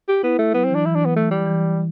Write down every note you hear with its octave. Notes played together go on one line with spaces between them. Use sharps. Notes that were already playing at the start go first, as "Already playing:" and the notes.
G4
B3 E4
A3
F#3 B3
C4
E3
D4
E3 E4
D4
B3
A3
G3
E3